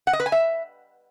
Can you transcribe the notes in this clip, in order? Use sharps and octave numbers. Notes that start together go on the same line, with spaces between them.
F#5
D#5
B4
G#5
E5